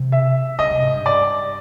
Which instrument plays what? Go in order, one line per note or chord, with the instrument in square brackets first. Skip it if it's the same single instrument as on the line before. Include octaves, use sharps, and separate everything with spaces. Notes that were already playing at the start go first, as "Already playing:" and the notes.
Already playing: [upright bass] C3
[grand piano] E5
[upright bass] C#3 [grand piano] D#5
[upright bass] C3
G#2
G2
[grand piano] D5